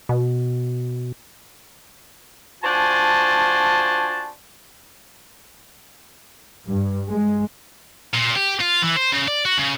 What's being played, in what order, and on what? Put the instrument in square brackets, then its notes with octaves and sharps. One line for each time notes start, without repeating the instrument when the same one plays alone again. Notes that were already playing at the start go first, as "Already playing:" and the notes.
[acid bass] B2
[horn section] D4 F4 F#4 C5 G#5 A5
[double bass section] G2
G#3
[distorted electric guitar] A#2
G4
F4
E3
C5
C#3
D5
F#4
C#3